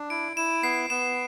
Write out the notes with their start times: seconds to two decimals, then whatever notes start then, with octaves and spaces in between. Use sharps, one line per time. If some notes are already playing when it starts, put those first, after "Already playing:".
Already playing: D4
0.10 E4 D7
0.37 E4 E7
0.63 B3 C7
0.90 B3 E7